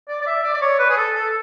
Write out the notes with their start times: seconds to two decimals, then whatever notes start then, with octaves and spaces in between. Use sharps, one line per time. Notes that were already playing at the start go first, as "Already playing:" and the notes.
0.09 D5
0.21 D5
0.27 E5
0.43 D5
0.55 D5
0.62 C#5
0.79 B4
0.90 G#4
0.97 A4
1.16 A4